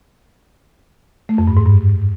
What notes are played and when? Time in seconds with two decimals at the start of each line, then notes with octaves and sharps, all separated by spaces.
1.29 A3
1.38 F2
1.48 G2
1.57 G#2
1.66 G2